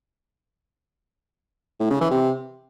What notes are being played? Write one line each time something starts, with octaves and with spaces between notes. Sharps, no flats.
A2
C#3
E3
C3